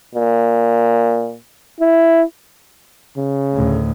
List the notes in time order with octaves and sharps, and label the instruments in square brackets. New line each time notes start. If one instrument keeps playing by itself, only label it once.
[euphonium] A#2
E4
[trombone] C#3
[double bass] D2 A2